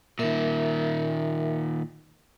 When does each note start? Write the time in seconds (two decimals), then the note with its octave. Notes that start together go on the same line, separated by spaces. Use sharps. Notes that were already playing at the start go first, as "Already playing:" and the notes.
0.19 A#2 D#3 A#4 E5